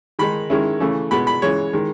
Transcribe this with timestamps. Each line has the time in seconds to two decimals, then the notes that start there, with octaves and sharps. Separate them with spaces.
0.19 D#3 G#3 D#4 B5
0.50 D#3 G#3 C#4 E4
0.80 C#3 E3 A3
1.11 B2 G#3 B3 B5
1.27 B5
1.42 C#3 E3 G#3 C#5
1.73 D#3 G#3